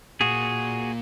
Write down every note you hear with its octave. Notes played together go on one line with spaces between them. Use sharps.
A#2 F#4 G#4